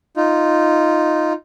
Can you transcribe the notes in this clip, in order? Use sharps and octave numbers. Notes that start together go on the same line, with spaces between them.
D#4 F4